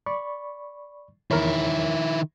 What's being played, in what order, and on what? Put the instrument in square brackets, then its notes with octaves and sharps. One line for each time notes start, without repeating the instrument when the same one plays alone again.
[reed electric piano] D5 B5 C#6
[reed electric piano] E2 A#4 C#5 [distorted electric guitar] D#3 E4